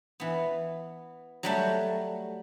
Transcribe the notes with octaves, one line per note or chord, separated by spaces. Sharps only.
E3 B3
F#3 G3 A3